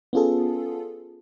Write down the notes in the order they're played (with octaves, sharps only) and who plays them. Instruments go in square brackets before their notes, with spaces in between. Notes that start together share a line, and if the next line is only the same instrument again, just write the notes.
[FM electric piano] B3 C#4 F4 G#4 A4